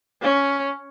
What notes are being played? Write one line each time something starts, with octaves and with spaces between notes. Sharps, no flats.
C#4